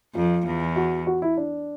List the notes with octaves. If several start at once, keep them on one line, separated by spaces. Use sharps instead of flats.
F2 F4
E2
F#4
F#4
E4
D4